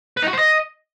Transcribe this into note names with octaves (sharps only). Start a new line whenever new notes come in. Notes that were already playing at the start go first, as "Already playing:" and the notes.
B4
D#4
F#4
C5
D#5